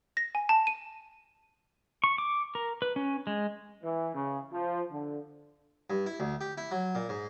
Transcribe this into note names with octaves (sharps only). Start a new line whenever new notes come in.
A#6
G#5
A5
D#7
C#6
D6
A#4
B4
C#4
G#3
E3
C#3
F3
D3
G2
E4
D2
G4
E4
F#3
A#2
G#2